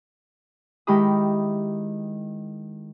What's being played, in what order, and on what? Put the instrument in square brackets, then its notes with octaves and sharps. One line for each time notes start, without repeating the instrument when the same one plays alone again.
[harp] D#3 G#3 E4 G4 B5 D#6